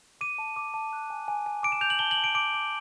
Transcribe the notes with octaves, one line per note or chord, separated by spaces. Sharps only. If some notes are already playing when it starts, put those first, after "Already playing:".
D6 D#7
A5
D6
A5
F#6
G#5
G#5
G#5
D6 D7
E7
G6 F7
F#7
A5 G7
F#7
A5
D7
D6 D7
D6